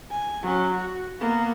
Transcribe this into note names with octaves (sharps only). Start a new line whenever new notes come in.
G#5
F#3 C#4
F#4
A#3 B3